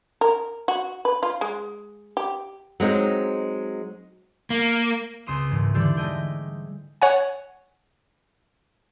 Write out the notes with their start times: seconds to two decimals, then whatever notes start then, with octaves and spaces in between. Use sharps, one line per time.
0.21 A#4
0.68 F#4
1.05 B4
1.23 F4
1.41 G#3
2.17 G4
2.80 F#3 G#3 C4 D#4
4.50 A#3
5.27 C#2 C4 C6 D#6 E7
5.51 E1 G#2
5.74 D3 E3 G3 D4 G4 A4
5.97 G#3 A3 D#5 G5
7.02 C#5 F#5 G#5